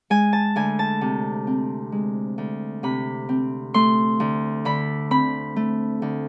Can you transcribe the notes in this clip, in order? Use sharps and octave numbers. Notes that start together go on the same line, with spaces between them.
G#3 G#5
A5
D2 G#5
A5
C3
C4
G#3
D2
C3 B5
C4
A3 C6
D2
D3 B5
C4 B5
A3
D2